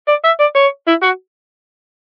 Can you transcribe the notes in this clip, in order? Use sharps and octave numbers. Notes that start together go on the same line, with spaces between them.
D5
E5
D5
C#5
E4
F#4